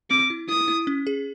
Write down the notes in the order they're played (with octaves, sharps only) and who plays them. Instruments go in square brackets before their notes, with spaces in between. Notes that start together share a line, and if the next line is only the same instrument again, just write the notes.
[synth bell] C4 [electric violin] D6
[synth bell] E4
[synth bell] E4 [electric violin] D#6
[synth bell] E4
C#4
G#4